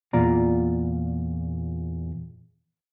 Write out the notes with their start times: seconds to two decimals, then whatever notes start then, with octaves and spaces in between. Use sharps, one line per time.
0.13 E2 A#2 F4 D5 A#5